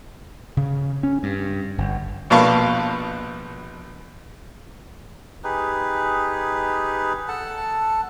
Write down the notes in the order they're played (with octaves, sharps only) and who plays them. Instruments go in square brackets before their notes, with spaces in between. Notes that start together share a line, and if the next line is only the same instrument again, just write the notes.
[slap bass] C#3
C#4
G2
G1
[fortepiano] A#1 B2 B3 F5 A5 C#6
[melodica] D#4 G4 G#4 B4
A4 F#5 A5